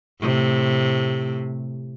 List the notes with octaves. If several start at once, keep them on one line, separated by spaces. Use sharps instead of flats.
A2 C3